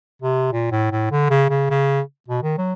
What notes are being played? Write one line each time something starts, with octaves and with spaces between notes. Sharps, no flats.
C3
A#2
A2
A2
D3
C#3
C#3
C#3
B2
D#3
F#3